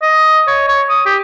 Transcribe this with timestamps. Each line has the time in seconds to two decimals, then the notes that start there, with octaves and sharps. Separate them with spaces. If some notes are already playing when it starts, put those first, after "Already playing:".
0.02 D#5
0.47 C#5
0.68 C#5
0.89 D#6
1.06 G4